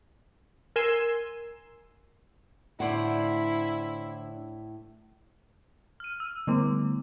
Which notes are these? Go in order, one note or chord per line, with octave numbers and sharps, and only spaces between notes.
A#4 G#5 C6 E6
A2 D3 E4 C5 D5 F#5
F6 D#7
E6
D3 G3 A3 B3 D6